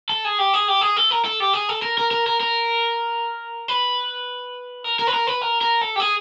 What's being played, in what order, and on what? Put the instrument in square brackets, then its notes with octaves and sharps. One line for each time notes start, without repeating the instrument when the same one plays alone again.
[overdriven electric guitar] A4
G#4
G4
G#4
G4
G#4
A4
A#4
A4
G4
G#4
A4
A#4
A#4
A#4
A#4
A#4
B4
A#4
A#4
B4
A#4
B4
A#4
A#4
A4
G4
G#4